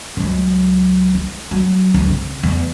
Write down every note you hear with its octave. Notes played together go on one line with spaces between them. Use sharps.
C#2 F#3
E4
F#3
C#2 D3
C#3 C4
E2